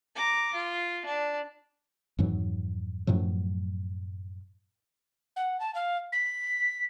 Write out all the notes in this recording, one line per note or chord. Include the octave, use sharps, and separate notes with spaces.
A#5 D6
F4
D4
F2 G#2 E3 F#3
F#2 A2 F3 F#3
F#5
A5
F5
B6